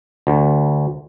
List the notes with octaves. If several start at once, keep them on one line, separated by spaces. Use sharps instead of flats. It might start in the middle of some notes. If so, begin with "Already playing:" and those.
D2